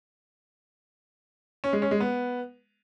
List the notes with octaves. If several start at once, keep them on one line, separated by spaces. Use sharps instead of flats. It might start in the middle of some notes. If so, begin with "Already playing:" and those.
C#4
G#3
C#4
G#3
B3